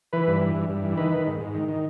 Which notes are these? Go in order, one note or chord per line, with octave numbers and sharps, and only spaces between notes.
E3 B4
G2
E3
G2
G2
E3
D#3 B4
D#3
G#2
G#2
D#3
D#3